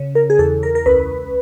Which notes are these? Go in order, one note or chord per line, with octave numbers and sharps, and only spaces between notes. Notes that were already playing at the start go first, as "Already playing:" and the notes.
Already playing: C#3
A#4
G#4
E2 A4
A#4
A#4
C#2 B4